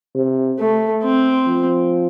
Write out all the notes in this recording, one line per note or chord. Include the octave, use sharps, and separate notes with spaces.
C3
A3
C4
F3